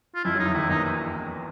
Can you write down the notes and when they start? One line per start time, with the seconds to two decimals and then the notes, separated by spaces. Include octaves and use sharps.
0.15 F4
0.25 F2 F3 E4
0.35 F#2 F#3
0.39 D#4
0.45 E2 E3
0.54 D#2 D#3 E4
0.69 A#1 A#2 D#4
0.84 E4